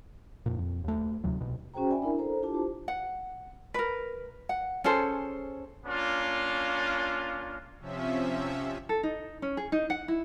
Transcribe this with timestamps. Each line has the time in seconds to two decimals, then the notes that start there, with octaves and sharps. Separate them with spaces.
0.46 F2 A#2
0.59 F2
0.84 D#2 A3
1.24 D2 C3 F#3
1.41 C2 B2
1.74 C#4 F#4 G#4 C5 G5 A#5
1.90 D5 E5 G#5 B5
2.02 D4 E4 A#4
2.19 A4 C5 A#5
2.42 D4 E4 F4 G4 A5 D6
2.54 G4 C5
2.88 F#5
3.74 A#4 B4
4.49 F#5
4.84 C#4 G#4 A4 C5
5.86 A#3 C#4 D4 F4
7.79 C3 F3 C#4 E5
8.89 A4
9.03 D#4
9.42 C#4
9.57 G#4
9.72 D#4
9.90 F#5
10.08 E4